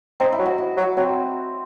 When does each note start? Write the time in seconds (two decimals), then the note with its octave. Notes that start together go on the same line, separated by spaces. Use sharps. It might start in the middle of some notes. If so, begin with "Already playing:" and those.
0.20 C4 D#4
0.32 E4
0.39 F#3
0.46 F#4
0.58 E4
0.77 F#3
0.97 F#3 C4